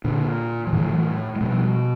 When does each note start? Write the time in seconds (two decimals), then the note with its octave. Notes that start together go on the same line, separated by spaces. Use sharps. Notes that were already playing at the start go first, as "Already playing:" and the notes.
0.04 A#2 D3
0.67 F3
0.73 A2 D3 E3
0.86 F3
0.90 E3 F#3
1.36 G#3
1.41 B2 F3 G3